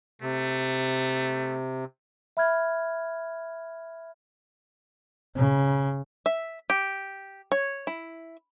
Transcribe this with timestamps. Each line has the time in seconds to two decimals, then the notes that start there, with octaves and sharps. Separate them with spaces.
0.22 C3 A3
2.37 E5 B5 F6 G#6
5.36 C#3
6.26 E5
6.70 G4
7.52 C#5
7.87 E4